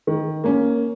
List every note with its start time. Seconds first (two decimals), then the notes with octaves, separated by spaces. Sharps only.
0.07 D#3
0.44 A#3 C#4